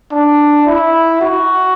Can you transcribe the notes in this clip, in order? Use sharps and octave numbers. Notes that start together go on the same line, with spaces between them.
D4
E4
F#4